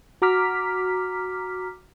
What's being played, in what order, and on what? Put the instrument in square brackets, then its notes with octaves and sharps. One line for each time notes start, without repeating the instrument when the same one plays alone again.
[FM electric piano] F#4 A#5 D6 F6 B6